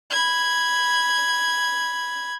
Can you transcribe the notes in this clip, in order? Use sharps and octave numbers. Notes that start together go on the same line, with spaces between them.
B5 G#6